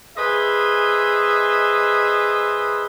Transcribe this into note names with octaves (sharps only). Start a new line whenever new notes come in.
G#4 B4 C5 D#5 E5